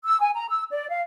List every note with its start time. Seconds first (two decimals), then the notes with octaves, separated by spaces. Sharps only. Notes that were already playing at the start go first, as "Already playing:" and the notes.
0.04 E6
0.21 G#5
0.35 A#5
0.49 E6
0.71 D5
0.90 F5